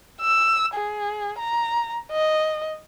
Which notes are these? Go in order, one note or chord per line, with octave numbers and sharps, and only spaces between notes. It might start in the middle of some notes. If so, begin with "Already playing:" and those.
E6
G#4
A#5
D#5